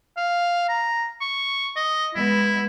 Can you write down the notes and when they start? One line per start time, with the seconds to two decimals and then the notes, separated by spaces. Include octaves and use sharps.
0.17 F5
0.69 A#5
1.21 C#6
1.76 D#5
2.15 G#3 B3 E4